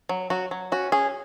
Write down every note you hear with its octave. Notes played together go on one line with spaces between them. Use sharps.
F#3
F#3 F#4
F#3
C#4 F#4
C#4 G#4